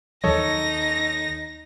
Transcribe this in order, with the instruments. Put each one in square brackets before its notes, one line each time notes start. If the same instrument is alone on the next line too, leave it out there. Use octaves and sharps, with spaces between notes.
[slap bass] D#2 D#3 F#3 [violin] D#4 A#6 [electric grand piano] A4 C#5 D#5